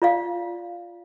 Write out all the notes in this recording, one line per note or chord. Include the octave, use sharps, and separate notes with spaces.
F4 D5 F5